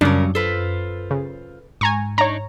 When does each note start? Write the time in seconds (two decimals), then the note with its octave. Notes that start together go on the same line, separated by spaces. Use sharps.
0.01 F#2 C#3 F#3 G3 C#4 D4 A#4
0.35 F4 A4 B4 C5
1.11 C#3
1.81 G#2 G#5 A#5 C#6
2.18 D4 D#4 C#5 A#5